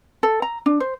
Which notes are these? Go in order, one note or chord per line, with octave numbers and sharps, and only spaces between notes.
A4
A#5
D4
C5